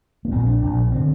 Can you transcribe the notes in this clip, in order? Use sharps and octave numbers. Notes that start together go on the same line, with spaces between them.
A#3
A#1 A#2 C4
D4
A#1 A#2
D3 C4